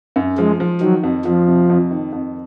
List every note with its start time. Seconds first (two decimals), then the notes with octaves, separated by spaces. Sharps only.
0.16 F#2
0.38 F3 G#3
0.60 F3
0.81 D#3 F#3
1.03 F2
1.25 F2 F3
1.48 C3
1.70 F2
1.91 D#3
2.12 F2